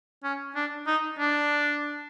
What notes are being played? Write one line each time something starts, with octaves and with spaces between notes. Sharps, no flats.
C#4
D4
D#4
D4